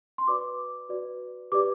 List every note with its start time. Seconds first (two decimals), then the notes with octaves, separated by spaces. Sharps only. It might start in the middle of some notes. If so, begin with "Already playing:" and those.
0.18 C6
0.27 F#4 B4 D5 D6
0.89 F#4 B4 D5
1.52 G4 B4 D5 D6